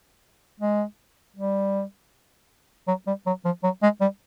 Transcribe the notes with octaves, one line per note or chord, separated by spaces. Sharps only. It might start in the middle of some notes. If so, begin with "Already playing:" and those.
G#3
G3
F#3
G3
F#3
F3
F#3
G#3
G3